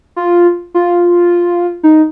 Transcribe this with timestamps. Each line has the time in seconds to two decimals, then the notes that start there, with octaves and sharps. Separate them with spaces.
0.16 F4
0.74 F4
1.83 D#4